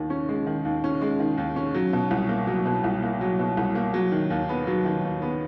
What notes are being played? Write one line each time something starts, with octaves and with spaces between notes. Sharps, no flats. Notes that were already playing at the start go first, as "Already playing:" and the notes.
Already playing: D#2 D#3
C#4
G#3
D#3
D#2
C#4
G#3
D#3
D#2
C#4
F#3
B2
C2
A#3
F#3
B2
C2
A#3
F#3
B2
C2
A#3
F#3
D#3
D#2
B3
F#3
D#3
D#2
B3